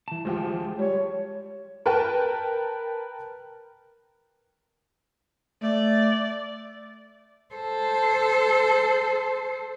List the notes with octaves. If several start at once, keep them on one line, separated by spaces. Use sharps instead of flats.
E3 A5
D2 F3 G#3 G4
G3 C#5
A#4 B4 G5 A5
A3 D5
A4 C5